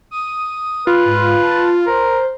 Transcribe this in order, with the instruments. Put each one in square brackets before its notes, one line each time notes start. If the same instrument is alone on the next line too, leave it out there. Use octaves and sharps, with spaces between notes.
[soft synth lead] D#6
[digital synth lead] F4 [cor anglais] B4
[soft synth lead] G#2
A5
[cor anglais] A#4 [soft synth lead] C5